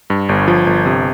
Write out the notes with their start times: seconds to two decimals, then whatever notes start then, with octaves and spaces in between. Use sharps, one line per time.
0.10 G2
0.29 G1
0.48 F3
0.67 G1
0.86 C3